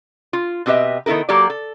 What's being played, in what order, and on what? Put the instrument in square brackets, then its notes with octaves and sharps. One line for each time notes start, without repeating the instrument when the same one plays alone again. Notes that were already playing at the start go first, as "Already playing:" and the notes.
[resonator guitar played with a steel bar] F4
B2 C4 G4 B4 D#5 E5
D#3 B3 E4 A4 A#4
F#3 A#3 G4 A4 D5
A4